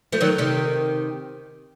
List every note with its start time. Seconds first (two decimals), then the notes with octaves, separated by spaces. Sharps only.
0.12 F3 A3
0.21 D#3 F#3
0.38 C3 D#3